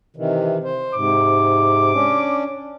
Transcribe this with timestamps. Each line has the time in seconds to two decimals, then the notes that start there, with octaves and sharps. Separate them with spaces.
0.16 C3 D#3 E3
0.64 C5
0.95 G#2 C3 D6
1.93 C#4 D4